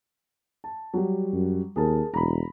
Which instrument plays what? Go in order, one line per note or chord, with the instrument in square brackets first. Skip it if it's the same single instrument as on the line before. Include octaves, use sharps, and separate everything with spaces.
[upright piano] A5
F#3 G3
[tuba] F#2
[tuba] D#2 [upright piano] G#4 A#4 A5
[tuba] E1 [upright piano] A#5 B5